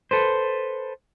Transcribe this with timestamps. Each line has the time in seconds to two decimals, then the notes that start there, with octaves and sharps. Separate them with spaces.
0.11 A4 B4 C5